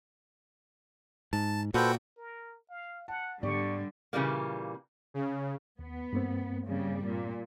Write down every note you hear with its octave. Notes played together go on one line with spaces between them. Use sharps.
G#2 A5
A#2 F#4 A4 B4 C5 G5
A#4
F5
F#5 A5
G#2 D3 G3 B3 G4 D5 C#6
A#2 C#3 E3 G3 A#3
C#3
D#2 B3
G2 A#3 C4
C#3 G3
A#2